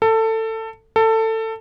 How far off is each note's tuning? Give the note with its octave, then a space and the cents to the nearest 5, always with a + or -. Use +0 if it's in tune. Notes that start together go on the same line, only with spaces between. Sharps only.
A4 +20
A4 +20